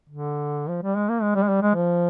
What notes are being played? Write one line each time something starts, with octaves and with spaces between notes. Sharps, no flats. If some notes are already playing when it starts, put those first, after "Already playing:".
D3
F3
G3
G#3
A#3
G#3
G3
G#3
G3
G#3
F3